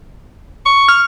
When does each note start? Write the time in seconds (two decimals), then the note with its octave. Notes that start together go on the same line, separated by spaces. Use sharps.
0.66 C#6
0.88 F6